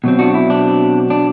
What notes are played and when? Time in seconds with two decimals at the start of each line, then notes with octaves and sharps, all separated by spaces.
0.04 B2 F#3 C4
0.19 D4 F#4
0.34 E4
0.50 D4
1.10 D4